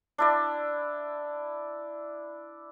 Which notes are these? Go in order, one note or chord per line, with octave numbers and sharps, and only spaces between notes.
D4 E4 D5